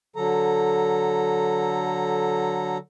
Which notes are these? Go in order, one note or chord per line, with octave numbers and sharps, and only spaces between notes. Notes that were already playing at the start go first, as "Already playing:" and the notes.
D3 F#3 A4 A#5